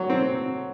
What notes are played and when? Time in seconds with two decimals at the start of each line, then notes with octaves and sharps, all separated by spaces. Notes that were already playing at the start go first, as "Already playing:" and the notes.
Already playing: F#3
0.10 C4